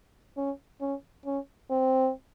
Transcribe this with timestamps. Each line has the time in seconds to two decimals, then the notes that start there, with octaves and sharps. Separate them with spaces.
0.37 C#4
0.81 C#4
1.26 C#4
1.71 C4